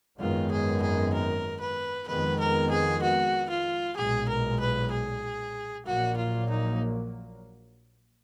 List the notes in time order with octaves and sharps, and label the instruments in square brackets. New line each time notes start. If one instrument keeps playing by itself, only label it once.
[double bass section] G#1 F#2 D#3 G#3 B3 [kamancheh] F4
[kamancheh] G#4
G#4
A#4
B4
[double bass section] F2 D#3 G#3 B3 [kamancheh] B4
[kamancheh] A#4
G#4
F#4
F4
[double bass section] B1 A#2 G#3 [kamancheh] G#4
[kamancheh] A#4
B4
G#4
[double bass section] A#1 A#2 F#3 A#3 [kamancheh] F#4
[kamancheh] F4
D#4